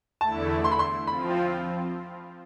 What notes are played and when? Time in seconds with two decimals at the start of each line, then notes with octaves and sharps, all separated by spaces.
0.21 E2 D3 A3 E4 A5
0.64 C6
0.71 B5
0.79 C6
1.07 F3 C4 F4 B5